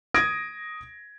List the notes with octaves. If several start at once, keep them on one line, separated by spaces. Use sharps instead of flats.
D#6 G#6 A#6 D7